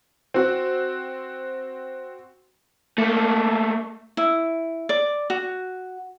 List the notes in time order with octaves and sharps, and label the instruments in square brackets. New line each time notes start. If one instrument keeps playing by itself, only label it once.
[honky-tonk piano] C4 F#4
[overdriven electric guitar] A3 A#3
[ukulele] E4
D5
F#4